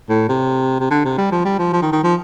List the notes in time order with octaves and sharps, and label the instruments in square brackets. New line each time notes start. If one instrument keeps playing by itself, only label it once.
[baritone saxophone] A2
C3
C3
D3
C3
G3
F3
G3
F3
F3
D#3
D#3
F3